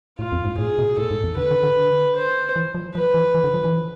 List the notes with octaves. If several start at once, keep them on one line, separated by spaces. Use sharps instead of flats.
A2 F4
F2
G#2
A2 G#4
B2
A2 A4
G#2
E2
D3 B4
D3
D3
C5
E3
F3
F3 B4
E3
E3
D3
F3
E3